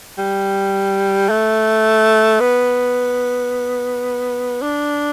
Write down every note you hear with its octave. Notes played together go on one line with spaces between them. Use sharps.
G3
A3
B3
D4